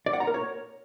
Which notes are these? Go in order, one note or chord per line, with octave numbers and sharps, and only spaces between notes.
D5
F#5
A#5
A#4
C#5